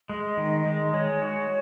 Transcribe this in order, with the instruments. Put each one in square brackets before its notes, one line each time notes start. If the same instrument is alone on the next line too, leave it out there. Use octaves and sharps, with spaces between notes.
[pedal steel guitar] G#3 [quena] D#5
[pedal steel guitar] D#3
G#3
[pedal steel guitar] G#3 [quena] C#5
[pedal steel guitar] F#4